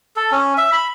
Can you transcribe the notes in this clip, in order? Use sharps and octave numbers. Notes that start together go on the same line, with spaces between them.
A4
C#4
E5
B5